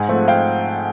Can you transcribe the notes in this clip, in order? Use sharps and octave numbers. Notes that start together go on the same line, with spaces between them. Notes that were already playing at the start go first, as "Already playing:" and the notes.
Already playing: G#2 F#5 G#5
F3 A3 C4
F5 G5